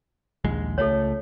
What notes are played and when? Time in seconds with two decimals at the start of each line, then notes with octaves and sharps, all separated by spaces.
0.44 A#1 D#2 G#3
0.78 C#2 A3 A4 C#5